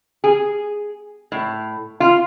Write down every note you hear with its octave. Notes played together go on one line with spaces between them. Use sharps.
G#4
A2
F4